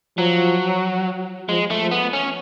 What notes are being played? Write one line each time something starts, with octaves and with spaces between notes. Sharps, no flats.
F3 F#3
F3 G#3
A3
F3
B3
C#4